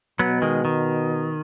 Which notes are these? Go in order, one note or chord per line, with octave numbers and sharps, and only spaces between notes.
B2 F#3 B3
D#3 G#3
D#3